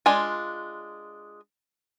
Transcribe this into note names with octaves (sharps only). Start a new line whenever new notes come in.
G#3 D4 F4 G#5